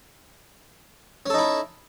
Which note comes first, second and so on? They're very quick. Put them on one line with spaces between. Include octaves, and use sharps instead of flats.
C#4 A4 D#4 E4